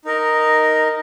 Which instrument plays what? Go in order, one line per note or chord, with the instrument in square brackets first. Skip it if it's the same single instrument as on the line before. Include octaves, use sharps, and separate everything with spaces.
[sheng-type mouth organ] D#4 A#4 D#5